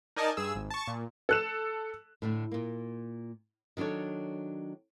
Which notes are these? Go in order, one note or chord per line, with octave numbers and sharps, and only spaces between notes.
D#4 A#4 D5 D#5 G#5 A5
G2 G#4 E6
G#1
A5 C#6
A#2
A4 F#6 E7
A2 D3 A3
A#2 A#3
D#3 F#3 D4 A4 C#5